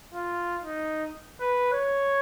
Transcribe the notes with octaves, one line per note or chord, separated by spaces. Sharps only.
F4
D#4
B4
C#5